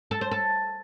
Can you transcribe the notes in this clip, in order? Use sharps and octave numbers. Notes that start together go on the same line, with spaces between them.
A4
C5
A4